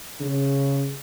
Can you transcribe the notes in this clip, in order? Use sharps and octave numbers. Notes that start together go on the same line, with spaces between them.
C#3